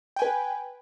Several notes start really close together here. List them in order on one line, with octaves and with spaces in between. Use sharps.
G5 G#5 B4